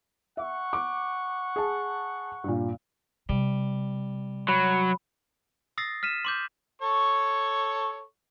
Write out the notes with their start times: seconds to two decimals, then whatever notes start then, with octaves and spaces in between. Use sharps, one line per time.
0.37 E5 F#5 C#6
0.73 D6
1.56 G#4 A5
2.44 G2 A#2
3.29 C3 G3
4.48 F#3 B5
5.78 D#6 E6 A6 A#6 C7
6.03 F6 B6 D#7 E7
6.25 C6 D6 G6
6.82 A4 C#5 C#6